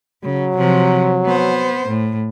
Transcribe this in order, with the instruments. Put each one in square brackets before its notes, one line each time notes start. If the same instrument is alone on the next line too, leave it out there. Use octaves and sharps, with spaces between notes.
[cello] C#3 [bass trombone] F#3
[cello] C3 F3
B3 C5
A2